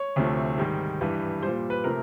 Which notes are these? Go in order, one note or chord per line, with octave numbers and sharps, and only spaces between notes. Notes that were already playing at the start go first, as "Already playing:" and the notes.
Already playing: C#5
D2 C3 F3 A3
G#2 D#3 G3
G2 E3 G3
A#2 G3 C5
B4
C3 F3 A3 A#4